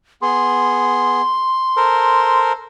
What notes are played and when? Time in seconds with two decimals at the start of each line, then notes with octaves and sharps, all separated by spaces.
0.22 B3 G#4 C6
1.77 A4 A#4 C5